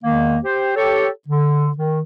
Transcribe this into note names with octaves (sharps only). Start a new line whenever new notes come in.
E2 D#3 G#3 A#3
G4 C5
G4 A4 C#5
D3
D#3